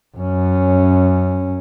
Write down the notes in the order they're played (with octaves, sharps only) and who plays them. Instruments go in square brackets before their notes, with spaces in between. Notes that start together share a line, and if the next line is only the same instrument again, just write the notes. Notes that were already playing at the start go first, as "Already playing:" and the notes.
[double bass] F#2 C#4